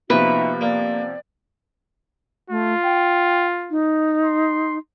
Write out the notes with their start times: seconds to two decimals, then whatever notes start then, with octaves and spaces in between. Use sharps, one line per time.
0.10 C3 F3 A#3 B3 D#4 F#4 B4 E5
0.61 A#3 D5
2.50 A3 F4
2.84 G5
3.71 D#4
4.23 C6